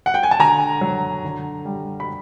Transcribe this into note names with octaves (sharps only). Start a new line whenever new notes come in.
F#5
G5
G#5
A5
D3 G#5 A#5
F#3
D3
G3
B5